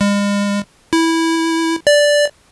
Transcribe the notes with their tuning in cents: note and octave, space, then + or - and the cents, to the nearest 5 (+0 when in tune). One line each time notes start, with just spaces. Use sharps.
G#3 -45
E4 -10
D5 -5